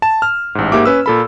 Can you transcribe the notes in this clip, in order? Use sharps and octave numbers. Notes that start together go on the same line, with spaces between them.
A5 E7
F6
A1 G#2
G#2 A#3 G4 G#4 E5 D6
C#4 B4 E6
A#2 A4 B5